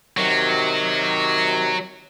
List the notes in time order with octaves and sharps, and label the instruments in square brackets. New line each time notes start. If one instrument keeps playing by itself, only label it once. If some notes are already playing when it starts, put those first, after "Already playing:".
[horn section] C3 D#3 [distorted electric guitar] F#3